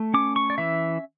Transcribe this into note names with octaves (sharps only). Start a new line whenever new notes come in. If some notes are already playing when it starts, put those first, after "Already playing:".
Already playing: A3
C#4 D6
C#6
D5
E3 E5